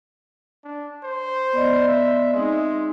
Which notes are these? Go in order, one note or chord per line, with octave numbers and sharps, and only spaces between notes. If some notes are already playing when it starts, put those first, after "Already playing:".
D4
C5
B3 D5 D#5
E5
G#3 C4 D#4